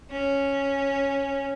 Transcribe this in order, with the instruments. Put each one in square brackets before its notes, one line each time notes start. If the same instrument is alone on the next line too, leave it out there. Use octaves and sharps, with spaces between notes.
[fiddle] C#4